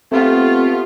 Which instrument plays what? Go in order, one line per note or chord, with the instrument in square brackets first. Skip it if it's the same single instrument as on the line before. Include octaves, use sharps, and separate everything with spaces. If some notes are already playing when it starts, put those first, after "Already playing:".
[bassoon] A3 [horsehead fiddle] B3 F4 [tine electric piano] C4 [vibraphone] G4 A4 B4